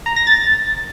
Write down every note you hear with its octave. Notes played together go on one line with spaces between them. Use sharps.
A#5
A#6
A6